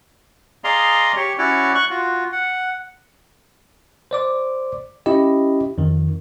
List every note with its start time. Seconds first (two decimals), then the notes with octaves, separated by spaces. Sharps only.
0.64 G#4 D5 D#5 F5 A#5 C6
1.16 G4 C#5
1.38 C#4 E4 F#4 C#5 D5
1.75 C#6 F#6
1.90 F4 F#4
2.32 F#5
4.11 C5 D5 D6
5.06 C#4 E4 G4 D#5
5.78 F2 D#3